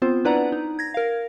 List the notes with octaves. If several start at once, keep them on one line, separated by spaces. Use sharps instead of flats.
B3 C4 F4 C5
D4 E4 B4 D5 F#5 A#5
D#4
G#6 A#6
A#4 F5